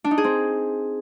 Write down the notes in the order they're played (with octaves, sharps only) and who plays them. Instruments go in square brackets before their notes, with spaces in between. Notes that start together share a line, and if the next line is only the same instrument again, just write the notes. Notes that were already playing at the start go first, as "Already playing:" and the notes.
[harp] D4
D#4
G#4
C4